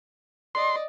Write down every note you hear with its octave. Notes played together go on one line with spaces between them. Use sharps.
D5 D#5 C6